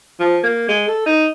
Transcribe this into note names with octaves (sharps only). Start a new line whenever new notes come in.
F3
A#3
G#3
A4
D#4